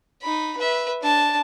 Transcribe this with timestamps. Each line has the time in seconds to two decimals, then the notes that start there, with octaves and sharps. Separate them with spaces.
0.22 D#4 B5
0.57 B4 E5
1.02 D4 A5